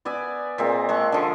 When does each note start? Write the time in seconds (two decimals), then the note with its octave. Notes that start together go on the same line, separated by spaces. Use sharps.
0.05 B3 D5 E5 G#5
0.58 A#2 G#3 C4
0.89 G#3 A5 C#6
1.12 D3 F3